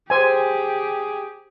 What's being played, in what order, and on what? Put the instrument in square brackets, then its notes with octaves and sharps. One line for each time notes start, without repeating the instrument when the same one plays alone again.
[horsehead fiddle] G4 G#4 [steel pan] C5 G#5